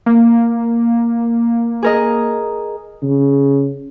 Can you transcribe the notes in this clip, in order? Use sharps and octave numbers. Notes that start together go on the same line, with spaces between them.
A#3
G#4 A#4 D#5
C#3